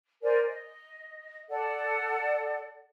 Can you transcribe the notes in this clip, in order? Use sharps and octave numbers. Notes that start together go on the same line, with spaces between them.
A#4 C5 D5 G#5
D#5
A4 D5 F#5